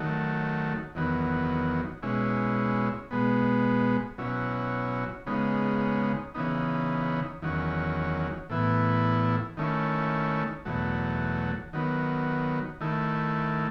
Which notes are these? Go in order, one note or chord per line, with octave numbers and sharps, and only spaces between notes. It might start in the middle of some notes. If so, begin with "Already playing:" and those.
Already playing: D#3 F#3 A3
E2 D#3 F#3 B3
B2 G#3 C#4 E4
B2 G#3 B3
B2 F#3 C#4 E4
C#3 G#3 B3 D#4
C#3 E3 B3 D#4
E2 D#3 F#3 C#4
A2 E3 B3 E4
D#3 A3 C#4 E4
E2 B2 F#3 A3
D#3 F#3 B3
D#3 A3 E4